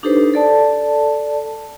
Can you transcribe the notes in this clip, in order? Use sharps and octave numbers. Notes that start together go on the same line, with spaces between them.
D4 D#4 G4 A4 B4 C5
A4 D5 A5